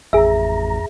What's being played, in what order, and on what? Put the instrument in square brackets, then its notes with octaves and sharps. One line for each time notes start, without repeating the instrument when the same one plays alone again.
[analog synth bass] A1 [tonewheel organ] F2 A#5 [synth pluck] G#4 E5